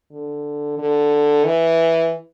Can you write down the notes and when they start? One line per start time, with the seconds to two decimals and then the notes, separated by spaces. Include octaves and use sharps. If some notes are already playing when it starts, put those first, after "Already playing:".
0.12 D3
0.78 D3
1.44 E3